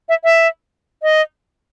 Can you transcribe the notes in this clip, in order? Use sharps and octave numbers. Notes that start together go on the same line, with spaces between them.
E5
E5
D#5